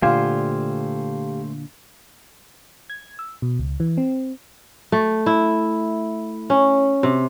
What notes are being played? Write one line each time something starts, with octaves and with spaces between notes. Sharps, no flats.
A#2 D3 A3 F4 G4 C5 F5 G#5
G#6
E6
B2
C#2
E3
C4
A3
E4
C#4
C3